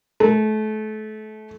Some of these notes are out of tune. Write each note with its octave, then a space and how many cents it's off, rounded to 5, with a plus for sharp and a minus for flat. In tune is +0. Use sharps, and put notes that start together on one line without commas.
A3 -30